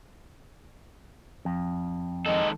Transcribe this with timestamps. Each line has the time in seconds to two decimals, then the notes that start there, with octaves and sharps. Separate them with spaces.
1.45 F2
2.26 D#3 G#3 A4 D#5